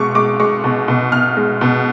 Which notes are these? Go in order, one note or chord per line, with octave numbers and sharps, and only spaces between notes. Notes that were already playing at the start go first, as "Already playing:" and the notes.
Already playing: B2 G#3 C#6 D6
G#3 D6
G#3 C#6
B2
B2
B2 F6
G#3
B2